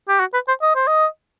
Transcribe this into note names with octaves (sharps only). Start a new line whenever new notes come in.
G4
F#4
B4
C5
D#5
C5
D#5